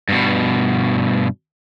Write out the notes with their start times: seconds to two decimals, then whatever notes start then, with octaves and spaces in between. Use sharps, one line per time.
0.09 G2 B2